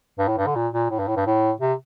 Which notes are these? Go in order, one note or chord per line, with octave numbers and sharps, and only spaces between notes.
G2
A2
G2
D3
A#2
A#2
A2
G2
A2
G2
A2
C3